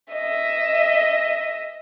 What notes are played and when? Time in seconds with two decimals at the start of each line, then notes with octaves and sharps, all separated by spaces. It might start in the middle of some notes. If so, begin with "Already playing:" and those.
0.12 D#5 E5